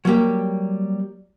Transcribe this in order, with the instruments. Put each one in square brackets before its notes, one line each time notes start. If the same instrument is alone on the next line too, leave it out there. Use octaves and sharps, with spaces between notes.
[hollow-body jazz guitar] F#3 G3 A#3 G4